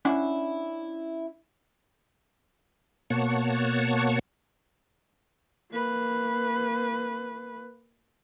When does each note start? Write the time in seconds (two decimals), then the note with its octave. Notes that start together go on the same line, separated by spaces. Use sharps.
0.05 C#4 D4 E4 F#5
3.10 B2 A#3 C#5 F#5 A5 C#6
5.72 A#3 B4